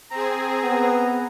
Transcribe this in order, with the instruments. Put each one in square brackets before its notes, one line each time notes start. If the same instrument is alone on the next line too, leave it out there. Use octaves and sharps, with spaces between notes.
[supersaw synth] C4 G#4 [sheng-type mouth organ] A#5
[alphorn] B3